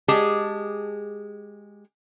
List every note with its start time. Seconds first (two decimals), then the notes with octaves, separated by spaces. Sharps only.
0.08 G#3 G4 G#4 A5